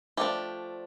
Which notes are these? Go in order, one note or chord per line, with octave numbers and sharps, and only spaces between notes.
F3 A3 D4 G4